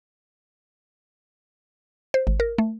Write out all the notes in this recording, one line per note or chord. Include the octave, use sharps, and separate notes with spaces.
C5
G#1
A#4
A3